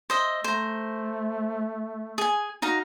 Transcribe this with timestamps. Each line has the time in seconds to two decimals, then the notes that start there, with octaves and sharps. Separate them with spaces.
0.10 C5 D#5 E5
0.44 A3 C5 A#5
2.18 G#4 G#5
2.62 D#4 F#4 F5 A#5